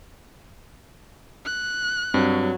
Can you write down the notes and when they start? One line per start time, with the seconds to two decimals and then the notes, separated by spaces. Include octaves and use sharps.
1.46 F#6
2.14 G2 F#3 C4